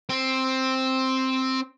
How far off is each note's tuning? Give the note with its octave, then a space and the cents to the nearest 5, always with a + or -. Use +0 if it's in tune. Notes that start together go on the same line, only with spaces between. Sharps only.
C4 +5